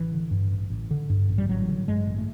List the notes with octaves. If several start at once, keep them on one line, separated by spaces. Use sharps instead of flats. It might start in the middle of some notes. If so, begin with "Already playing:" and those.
Already playing: A1 E3
D3
G2
A1
A1
D3
G2
A1
G3
A1 F#3
D3
G2 G#3
A1
A3